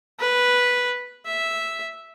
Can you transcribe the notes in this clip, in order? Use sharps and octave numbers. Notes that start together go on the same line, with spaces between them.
B4
E5